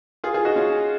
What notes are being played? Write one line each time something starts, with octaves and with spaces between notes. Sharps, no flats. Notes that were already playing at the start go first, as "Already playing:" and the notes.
F4 G#4
F4 G#4
D#4 F#4
C#4 F4